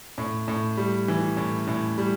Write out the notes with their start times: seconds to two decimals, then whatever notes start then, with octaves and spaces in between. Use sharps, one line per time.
0.18 A2
0.48 A2
0.77 G3
1.08 E3
1.37 A2
1.67 A2
1.98 G3